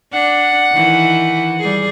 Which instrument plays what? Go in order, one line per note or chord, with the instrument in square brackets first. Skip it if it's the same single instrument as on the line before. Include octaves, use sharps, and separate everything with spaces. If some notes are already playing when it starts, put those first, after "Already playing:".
[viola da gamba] D4 [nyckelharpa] F#5
[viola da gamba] D#3 E3
G3 G#4